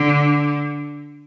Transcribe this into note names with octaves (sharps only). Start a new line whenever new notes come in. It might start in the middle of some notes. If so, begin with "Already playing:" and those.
Already playing: D3